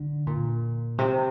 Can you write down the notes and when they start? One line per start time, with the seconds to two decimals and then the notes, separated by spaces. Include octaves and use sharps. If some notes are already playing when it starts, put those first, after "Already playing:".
Already playing: D3
0.27 A#2
0.99 C3